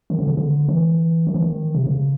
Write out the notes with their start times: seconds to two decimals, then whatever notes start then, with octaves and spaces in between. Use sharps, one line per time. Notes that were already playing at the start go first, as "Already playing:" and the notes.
0.10 D#3
0.19 D3
0.28 C#3
0.37 D3
0.68 E3
1.27 D#3
1.34 E3
1.42 D#3
1.75 C3
1.87 C#3